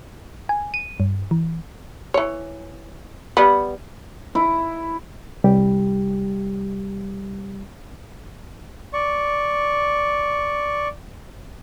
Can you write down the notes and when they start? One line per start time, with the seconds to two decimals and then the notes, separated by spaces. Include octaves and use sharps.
0.49 G#5
0.74 D#7
1.00 G2
1.31 E3
2.14 E3 C#5
3.37 G3 B3
4.35 E4
5.44 C2 G3 G4
8.93 D5 C#6